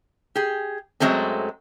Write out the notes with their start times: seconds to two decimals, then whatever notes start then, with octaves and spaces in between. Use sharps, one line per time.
0.35 G4 G#4
1.00 F#2 F#3 G#3 A3 C4